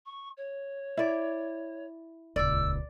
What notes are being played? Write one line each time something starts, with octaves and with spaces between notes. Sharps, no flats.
C#6
C#5
E4 D5
D#1 C#2 D5 E6